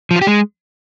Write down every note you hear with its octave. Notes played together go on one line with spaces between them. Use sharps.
F3
F4
G4
G#3